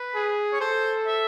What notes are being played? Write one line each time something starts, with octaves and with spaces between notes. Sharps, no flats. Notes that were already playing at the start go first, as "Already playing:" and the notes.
Already playing: B4
G#4
C#5
A4 C5
E5